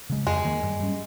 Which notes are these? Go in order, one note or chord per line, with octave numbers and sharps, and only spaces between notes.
C#3 G#3
F2 G#3
D#3 A#3
G2
G3 C#4